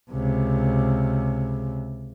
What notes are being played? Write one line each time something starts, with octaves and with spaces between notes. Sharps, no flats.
C#2 C3